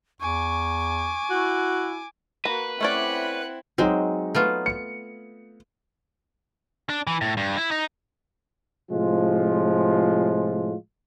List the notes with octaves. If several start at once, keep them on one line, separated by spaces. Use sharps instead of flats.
E2 G#5 C#6 D6
E4 F#4
A#3 F#4 B4 A#5
A3 C4 C#4 E4 D5 F#5 F#6
F#3 G#3 C4 D#4 F#4
A3 B3 F4
C#7
D4
E3
A2
G2
E4
D#4
A2 C3 F3 G#3 F4